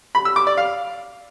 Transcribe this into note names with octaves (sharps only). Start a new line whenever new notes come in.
B5
E6
D6
D5
F5